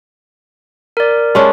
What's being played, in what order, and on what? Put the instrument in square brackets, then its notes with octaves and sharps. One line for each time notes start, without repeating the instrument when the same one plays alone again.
[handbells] A#4 D5
[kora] G#3 C#4 D4